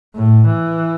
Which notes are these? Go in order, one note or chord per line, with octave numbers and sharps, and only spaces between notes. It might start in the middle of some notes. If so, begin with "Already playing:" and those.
A2
E3